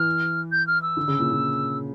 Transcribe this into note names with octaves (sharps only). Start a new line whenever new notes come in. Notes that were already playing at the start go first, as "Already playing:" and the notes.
Already playing: E3 F6
G6
F6
E6
D3
C#3
A#2
A#2